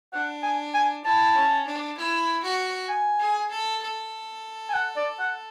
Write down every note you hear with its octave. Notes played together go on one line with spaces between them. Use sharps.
D4 F#5
G#5
G#5
E4 A5
C#4
D4
E4
F#4
G#5
G#4
A4
A4
G#5
F#5
D5
F#5